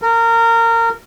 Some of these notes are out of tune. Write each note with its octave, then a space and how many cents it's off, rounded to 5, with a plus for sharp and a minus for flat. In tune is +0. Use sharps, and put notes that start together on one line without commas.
A#4 -25